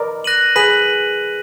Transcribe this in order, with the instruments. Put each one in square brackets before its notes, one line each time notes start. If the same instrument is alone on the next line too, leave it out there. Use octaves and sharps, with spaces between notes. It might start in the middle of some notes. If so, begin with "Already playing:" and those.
Already playing: [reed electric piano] A#4 B4 D5 D#5
[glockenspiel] F#6 A#6 D#7 F#7
[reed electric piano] G#4 B4 [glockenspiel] F#6 B6 D#7 F#7